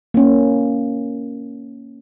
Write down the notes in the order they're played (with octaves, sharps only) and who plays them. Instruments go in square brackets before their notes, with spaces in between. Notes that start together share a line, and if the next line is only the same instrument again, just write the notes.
[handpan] A#3 C#4